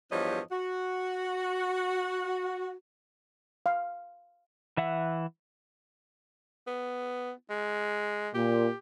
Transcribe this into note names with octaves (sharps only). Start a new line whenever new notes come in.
E2 G2 F3 G3 C#5 D#5
F#4
F5
E3 E5 F#5
B3
G#3
A#2 G4